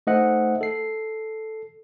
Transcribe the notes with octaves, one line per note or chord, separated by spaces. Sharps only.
A3 D#4 C5 D#5 E5 F#5
A4 C7